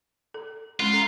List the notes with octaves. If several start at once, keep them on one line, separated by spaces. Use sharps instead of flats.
A4
G#3 C#4 F4
A4 A#5